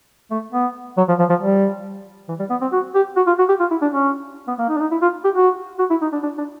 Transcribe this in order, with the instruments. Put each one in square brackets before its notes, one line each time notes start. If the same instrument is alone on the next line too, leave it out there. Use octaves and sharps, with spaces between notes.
[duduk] A3
B3
F#3
F3
F3
F3
G3
E3
G3
B3
C4
F#4
G4
F#4
F4
F#4
G4
F4
E4
D4
C#4
B3
A#3
D#4
D4
D#4
E4
F4
G4
F#4
F#4
E4
D#4
D4
D4
D4